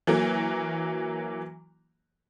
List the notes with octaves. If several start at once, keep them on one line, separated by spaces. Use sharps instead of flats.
E3 F#3 A#3